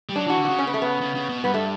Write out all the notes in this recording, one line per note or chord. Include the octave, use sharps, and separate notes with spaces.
G3
F#3 D4
E3 F#4
D3
C#3 F#4
C#4
B3
A3
B3
C#3
C#3
B2
G2 B3
A3